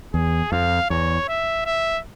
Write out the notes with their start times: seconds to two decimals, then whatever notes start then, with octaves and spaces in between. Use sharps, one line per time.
0.14 E2 G#4
0.52 F2 F5
0.90 E2 C#5
1.28 E5
1.65 E5